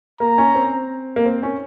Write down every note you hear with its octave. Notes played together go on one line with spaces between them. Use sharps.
A#3 A#5
C#4
C4
A#3
C4
C#4